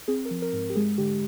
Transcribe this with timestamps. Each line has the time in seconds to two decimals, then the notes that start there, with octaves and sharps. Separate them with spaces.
0.08 C4 G#4
0.25 A#4
0.31 F3
0.42 A#4
0.53 G#2
0.70 G4
0.76 G#3 G#4
0.98 D3 G4